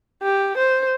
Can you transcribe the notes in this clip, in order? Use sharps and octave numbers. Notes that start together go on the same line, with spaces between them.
G4
C5